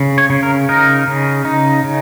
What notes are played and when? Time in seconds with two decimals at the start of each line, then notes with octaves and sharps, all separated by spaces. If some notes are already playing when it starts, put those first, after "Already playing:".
Already playing: C#3
0.18 C#5
0.30 C#3
0.43 A#4
0.69 D#4 A#4
1.07 C#3
1.45 D#4
1.84 C#3